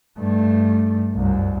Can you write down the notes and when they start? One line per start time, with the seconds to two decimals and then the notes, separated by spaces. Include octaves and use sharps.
0.18 G2 A3
1.15 C2 F#2